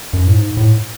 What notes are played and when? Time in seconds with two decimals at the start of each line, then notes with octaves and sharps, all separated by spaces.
0.13 F#2
0.27 A2
0.35 G#2
0.57 A2